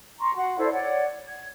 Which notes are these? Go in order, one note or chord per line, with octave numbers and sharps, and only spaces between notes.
A#5 C6 C#6
F#4 F#5 C6
E4 A4 C5 D5
C#5 D5 F#5
G#6